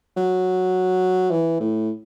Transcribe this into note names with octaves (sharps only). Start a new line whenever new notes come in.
F#3
E3
A2